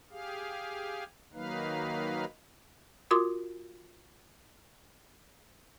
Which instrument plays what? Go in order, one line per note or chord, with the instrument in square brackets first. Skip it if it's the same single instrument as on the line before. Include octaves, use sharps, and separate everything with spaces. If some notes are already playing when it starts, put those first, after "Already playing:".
[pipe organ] G4 G#4 F5
D#3 F#3 A#3 D#4 B4 F5
[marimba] F4 F#4 A#4 C6 D6 D#6